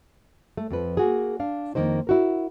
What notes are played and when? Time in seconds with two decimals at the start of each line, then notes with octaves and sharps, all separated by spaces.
0.57 A3
0.71 F2 F3 B4
0.97 A#3 F#4 G#4
1.40 D4 F5
1.75 F2 D#3 A#3 D#4 C5
2.07 E4 F#4 A#4